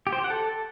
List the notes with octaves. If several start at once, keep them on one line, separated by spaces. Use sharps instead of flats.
G4
C5
G4
F#5
A4